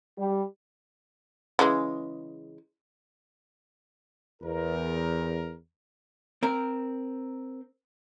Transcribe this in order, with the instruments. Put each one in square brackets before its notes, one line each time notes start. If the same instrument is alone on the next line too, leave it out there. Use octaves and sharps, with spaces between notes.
[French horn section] G3
[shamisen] C#3 E3 G#3
[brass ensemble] E2 A#4
[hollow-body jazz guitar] C4 A#4